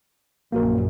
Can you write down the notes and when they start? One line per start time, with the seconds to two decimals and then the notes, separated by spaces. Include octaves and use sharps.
0.52 A#1 F#2 A#3 F#4 A#4